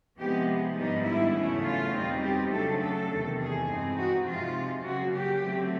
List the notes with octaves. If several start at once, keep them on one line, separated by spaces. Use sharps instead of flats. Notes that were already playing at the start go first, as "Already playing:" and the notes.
C3 F3 G#3 B3 D#4 G4
G#2 D#3 G3 B3 D4 D#4
E4
E2 C#3 F#3 A3 C#4
F4
B2 G3 C4 D#4
G4
C#3 F#3 A3 D4 A4
A4
E2 C3 D#3
G#4
G2 E3 G#3 C4 D#4
F#4
C3 F3 G#3 F4
C#3 F#3 A#3 F#4
G4
D3 F#3 A3 C4